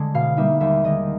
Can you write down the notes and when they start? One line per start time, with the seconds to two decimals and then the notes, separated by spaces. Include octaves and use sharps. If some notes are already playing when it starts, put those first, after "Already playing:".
Already playing: D3 G#3
0.14 B2 F5
0.37 G3 A#3 D#4 E5
0.60 D#2 E5
0.84 D#3 G#3 D#5